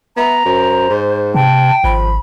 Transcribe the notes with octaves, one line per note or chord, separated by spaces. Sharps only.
B3 E5 A#5
F#2 C5
G#2
C3 G5 A5
G#1 F3 B5